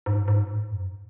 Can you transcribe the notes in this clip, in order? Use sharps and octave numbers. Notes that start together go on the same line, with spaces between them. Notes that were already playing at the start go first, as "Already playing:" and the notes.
G#2
G#2
A2
F#2